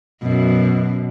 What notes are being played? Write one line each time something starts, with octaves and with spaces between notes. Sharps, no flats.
F#2 B2